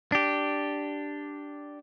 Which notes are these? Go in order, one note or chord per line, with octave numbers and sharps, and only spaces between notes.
D4 G4